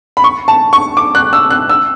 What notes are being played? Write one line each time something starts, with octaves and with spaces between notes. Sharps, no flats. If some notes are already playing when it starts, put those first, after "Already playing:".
B5
C#6
A5
C#6
D6
F#6
E6
F#6
E6